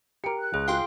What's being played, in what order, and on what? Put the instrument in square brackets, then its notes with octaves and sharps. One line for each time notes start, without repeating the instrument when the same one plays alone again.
[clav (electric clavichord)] G4 A#4 [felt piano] C#7 D7
[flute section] F#6
[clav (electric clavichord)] C#2 [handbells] G#4
[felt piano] F4 G#4 [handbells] F5 G5 C6